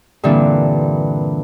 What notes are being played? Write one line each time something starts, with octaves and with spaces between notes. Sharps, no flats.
G2 A#2 D3 E3 C4 D4